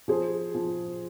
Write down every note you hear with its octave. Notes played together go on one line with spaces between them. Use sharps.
F3 G#4 C5
F3